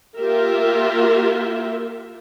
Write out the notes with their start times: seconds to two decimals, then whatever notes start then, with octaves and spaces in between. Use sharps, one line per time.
0.18 A#3 F4 G4 A#4 E5